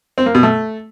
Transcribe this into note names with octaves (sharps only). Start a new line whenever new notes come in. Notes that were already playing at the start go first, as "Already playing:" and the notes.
C4
A#3
B2
A3